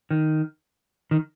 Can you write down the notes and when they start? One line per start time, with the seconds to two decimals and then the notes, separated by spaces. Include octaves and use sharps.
0.10 D#3
1.11 D#3